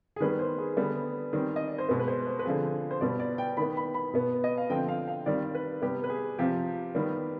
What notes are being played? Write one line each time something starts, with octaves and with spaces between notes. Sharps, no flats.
G#4
D#3 G3 B3 B4
C5
G#4
D3 G3 B3
D#3 G3 C4
D#5
D5
C5
B2 G#3 B3 B4
B4
C5
C5
B4
D3 F3 C4 G#4
C5
B2 G3 B3 D5
D5
G5
D#3 B3 B5
B5
B5
B2 B3
D#5
F5
D3 F3 C4 G5
F5
F5
D#3 G3 C4 D5
B4
C3 G3 B3 G4
B4
G#4
C3 F3 C4 G4
D#3 G3 B3